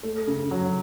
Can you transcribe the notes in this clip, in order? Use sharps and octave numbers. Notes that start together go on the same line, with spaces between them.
A3
C#3
F#3